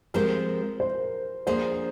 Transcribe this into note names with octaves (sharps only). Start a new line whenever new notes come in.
F3 G#3 C4 G4 A#4 C5
C5
F3 A#3 D4 G#4 C5